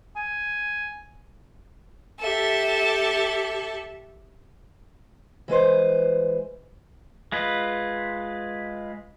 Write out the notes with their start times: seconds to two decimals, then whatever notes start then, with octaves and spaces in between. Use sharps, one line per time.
0.16 G#5
2.19 G4 A4 E5
5.48 E3 G#3 B4 C5
7.32 G#3 F4 B4